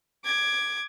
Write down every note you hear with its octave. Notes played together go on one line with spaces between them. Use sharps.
D6 G#6